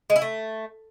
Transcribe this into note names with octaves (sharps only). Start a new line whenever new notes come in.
G#3
E4
A3